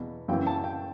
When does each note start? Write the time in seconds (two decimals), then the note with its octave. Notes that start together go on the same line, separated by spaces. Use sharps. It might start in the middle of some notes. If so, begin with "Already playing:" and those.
Already playing: E2 B2
0.28 F#2 C#3 E3 G5
0.47 A5
0.64 G5